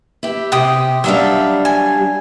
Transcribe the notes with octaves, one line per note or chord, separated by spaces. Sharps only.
E4 G4
C3 G4 G5 D#6
F#3 G3 D4 E5 F5
G#5